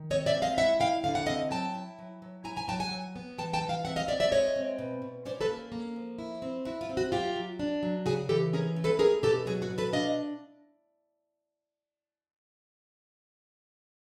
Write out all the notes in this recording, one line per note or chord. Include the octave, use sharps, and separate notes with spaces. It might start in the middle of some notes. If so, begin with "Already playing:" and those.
Already playing: D#3
C4 C#5 D#5
D5 E5
G#3
D#5 F5
E4 E5 F#5
E4 F5 G5
D3 F5
F#5
C4 D#5 F5
F#3 G5 A5
E4
F#3
F#3
E4 G#5 A#5
G#5 A#5
F#3 G5 A5
F#5 G#5
F#3
B3
E3 G5 A5
G5 A5
E3
F5 G5
C4 E5 F#5
D#5 F5
C4 D5 E5
D5 E5
G#3 C#5 D#5
C4
B2
B2
C#4 C5 D5
A4 B4
A#3
A#3
F3
E4
C4
E4 F#4
F4
C4
F#4
F#3 F4 G4
F#3
D4
F#3
C#3 F#4 G#4
E3 G4 A4
C#4 G#4 A#4
A3
A4 B4
C#4 G#4 A#4
B2 G4 A4
F#3 F#4 G#4
F#4
B2
A4 B4
D4 D#5 F5